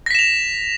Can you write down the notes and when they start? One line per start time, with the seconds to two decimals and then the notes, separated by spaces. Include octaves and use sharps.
0.06 A#6
0.11 B6
0.15 E7
0.19 F7